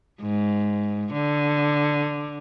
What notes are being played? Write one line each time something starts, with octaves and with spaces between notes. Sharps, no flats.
G#2
D3